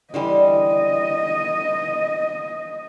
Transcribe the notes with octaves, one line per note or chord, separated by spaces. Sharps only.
D3 E3 G3 D#5